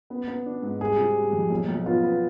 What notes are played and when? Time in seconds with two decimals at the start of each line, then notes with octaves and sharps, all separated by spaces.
0.10 B3
0.28 B3
0.46 D4
0.62 G#2
0.80 G3 G#4
0.97 C3
1.16 G3
1.33 F2
1.50 B1
1.68 B1
1.85 B3 F4
2.03 B3